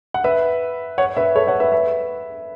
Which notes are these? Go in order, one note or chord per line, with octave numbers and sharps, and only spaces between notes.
F#5
B4 E5
C#5 F#5
B4 E5
A4 C#5
C#5 F#5
B4 E5
B4 E5